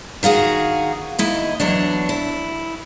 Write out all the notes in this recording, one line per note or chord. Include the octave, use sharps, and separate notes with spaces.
D#3 F4 F#4 G#4
D#2 E4 D#5
E2 F#3 D4
E4